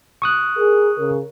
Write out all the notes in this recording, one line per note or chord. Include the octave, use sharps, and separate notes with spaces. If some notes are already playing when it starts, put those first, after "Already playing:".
C#6 D#6 F#6
G#4 A#4
C#3 A#4